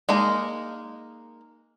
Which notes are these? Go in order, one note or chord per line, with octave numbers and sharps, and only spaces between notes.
G#3 A#3 D#4